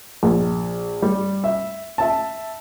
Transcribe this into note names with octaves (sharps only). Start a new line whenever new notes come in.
A#1
G3
E5
E5 A5